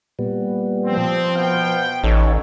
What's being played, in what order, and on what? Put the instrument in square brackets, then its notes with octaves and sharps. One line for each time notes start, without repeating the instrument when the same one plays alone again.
[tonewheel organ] A#2 G3 B3
[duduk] F3 [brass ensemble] C4
[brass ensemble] B2 B3 G5 [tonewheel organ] F5
[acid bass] A1 [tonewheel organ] D#4 A4 C#5